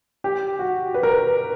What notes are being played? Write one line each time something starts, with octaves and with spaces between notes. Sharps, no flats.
G4
F#4
B4
A#4
B4